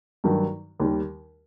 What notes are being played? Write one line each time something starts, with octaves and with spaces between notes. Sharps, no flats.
G2 D#3 F#3
D#2 D#3 G3